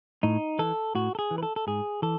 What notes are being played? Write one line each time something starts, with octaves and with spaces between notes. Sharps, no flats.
A2 D#4
E3 A4
A2 F#4
A4
G#4
E3
B4
A4
A4
G#2 G#4
E3 A4